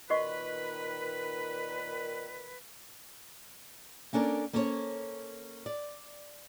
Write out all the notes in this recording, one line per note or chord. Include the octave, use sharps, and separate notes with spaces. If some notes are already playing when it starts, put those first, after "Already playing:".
A#2 D#3 F#4 B4 D#5 C#6
A#3 C#4 D4 A4 A#4
A#3 C#4 A4 C5 C#5
D5